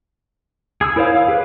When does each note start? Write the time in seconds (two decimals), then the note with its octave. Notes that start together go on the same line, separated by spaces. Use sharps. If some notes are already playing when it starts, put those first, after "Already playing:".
0.81 G#4 D#6 E6
0.96 E4 A#4 C5 C#5 F5
1.15 F5
1.28 G4 G#4 B4